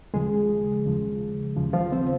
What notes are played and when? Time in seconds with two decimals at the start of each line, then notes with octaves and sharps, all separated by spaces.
0.14 D#2 C#3 F3 G#3 G#4
0.85 D#2 C#3 F3
1.57 D#2 C#3 F3
1.73 F3 F4
1.92 C4 C5